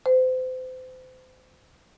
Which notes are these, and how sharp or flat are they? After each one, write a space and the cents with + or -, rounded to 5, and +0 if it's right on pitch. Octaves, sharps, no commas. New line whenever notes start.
C5 -35